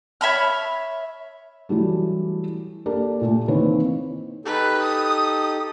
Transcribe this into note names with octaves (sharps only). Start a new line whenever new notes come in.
C#5 E5 B5 F6
E3 F#3 G3 A3
A#3 D4 G4 A4 A#4
A#2 A3
D#3 E3 A#3 C4 B4 C#5
D#4 G4 A4 B4
D#6